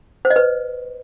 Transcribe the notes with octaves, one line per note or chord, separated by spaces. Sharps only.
C5
D#5
B4